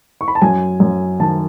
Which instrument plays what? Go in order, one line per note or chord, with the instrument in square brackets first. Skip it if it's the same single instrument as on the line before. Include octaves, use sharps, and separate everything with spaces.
[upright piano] C#6
B5
A5
F#2 G#5
F#2
D#3 A5